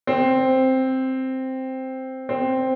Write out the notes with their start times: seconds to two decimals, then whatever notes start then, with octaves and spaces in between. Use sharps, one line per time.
0.07 C4
2.29 C4